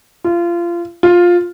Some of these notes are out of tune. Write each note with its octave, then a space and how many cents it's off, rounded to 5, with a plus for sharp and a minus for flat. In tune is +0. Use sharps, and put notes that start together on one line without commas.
F4 -25
F4 +10